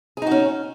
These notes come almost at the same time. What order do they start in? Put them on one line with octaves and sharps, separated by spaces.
G#4 D#4 F#4 C#4